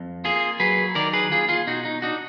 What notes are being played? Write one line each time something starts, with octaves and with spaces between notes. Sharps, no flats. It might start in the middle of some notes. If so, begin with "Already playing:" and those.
Already playing: F2
A#3 F4 G#4
F#3 G#4 B4
D#3 A#4 D5
G#4 B4
D#2 F4 G#4
F4 G#4
B2 D#4 F#4
D#4
D4 D#4 F#4